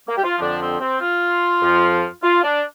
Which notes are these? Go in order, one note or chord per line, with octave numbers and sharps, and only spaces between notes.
A#3
G4
F4
F2 D3 F3 D4
C4
C4
F4
F2 F3
F4
D4